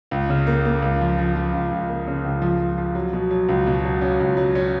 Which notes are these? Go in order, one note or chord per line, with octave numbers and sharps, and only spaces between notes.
C#2
C#3
A#3
A#3
C#2
F3
F3
F3
C#2
C#2
A#3
C#3
C#2
F3
F3
F3
F#3
B2
F#3
C#2
B2
F#3
C#4
C#2
F#3
C#4